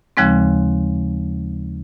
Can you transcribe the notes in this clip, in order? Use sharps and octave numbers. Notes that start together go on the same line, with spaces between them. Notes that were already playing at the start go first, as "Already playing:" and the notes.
D#2 C#3 F3 G#3 C4